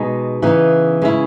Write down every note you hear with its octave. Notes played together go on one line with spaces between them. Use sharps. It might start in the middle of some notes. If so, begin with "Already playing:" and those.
Already playing: B2 G#3 D#4
C#3 E3 B3 D#4
C#3 G#3 C#4 E4